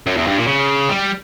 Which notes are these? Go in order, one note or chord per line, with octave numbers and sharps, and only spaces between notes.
F#2
E2
G2
A#2
C#3
G3